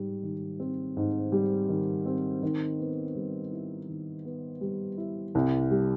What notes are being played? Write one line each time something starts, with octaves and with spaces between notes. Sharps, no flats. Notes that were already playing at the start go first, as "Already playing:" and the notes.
Already playing: G#2 G3
D#3
C4
G#2
G3
D#3
C4
D#3
B3
G3
E4
D#3
B3
G3
E4
C2
G3